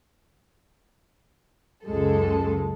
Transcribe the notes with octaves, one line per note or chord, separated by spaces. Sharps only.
C#2 F#2 G#3 A4